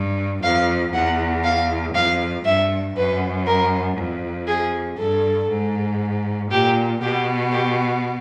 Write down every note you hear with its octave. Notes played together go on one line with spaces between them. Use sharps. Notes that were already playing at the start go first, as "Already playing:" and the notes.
Already playing: G2
F2 F5
E2 F#5
F5
F2 F5
G2 E5
F#2 B4
A#4
F2
G#4
G2 A4
G#2
A#2 G4
B2 G4
G4